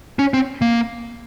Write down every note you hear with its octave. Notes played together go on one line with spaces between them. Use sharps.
C#4
C4
A#3